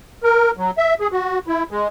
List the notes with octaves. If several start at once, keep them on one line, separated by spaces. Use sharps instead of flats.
A#4
F#3
E5
G#4
F#4
E4
G#3